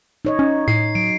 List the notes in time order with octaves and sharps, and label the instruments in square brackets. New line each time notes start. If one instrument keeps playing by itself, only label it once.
[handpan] D#4 C#5 D#5
[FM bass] C#4 [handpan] D#4
[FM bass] A2 [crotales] C7
[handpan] F#3 [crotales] D7